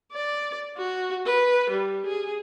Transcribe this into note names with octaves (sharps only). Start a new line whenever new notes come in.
D5
F#4
B4
G3
G#4